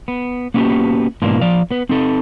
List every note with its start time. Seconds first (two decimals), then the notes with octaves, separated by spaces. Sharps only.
0.08 B3
0.54 A#3 B3 C#4 D4 F#4 G4
1.22 G#2 B2 E3 A#3 D4 F4
1.41 F3 D5 F5
1.71 B3 B4
1.89 C4 D#4 A4